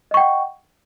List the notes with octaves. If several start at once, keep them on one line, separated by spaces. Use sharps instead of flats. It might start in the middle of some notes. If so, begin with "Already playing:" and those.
D#5 F#5 G5 C#6